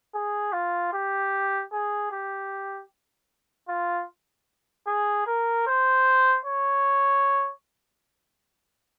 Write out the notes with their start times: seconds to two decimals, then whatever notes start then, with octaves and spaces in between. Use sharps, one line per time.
0.14 G#4
0.53 F4
0.93 G4
1.72 G#4
2.11 G4
3.68 F4
4.87 G#4
5.26 A#4
5.67 C5
6.45 C#5